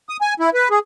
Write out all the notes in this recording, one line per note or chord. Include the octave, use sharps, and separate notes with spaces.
D#6
G#5
E4
B4
G#4